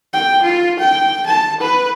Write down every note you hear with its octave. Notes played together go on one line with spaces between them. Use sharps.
G5
F4
G5
A5
B4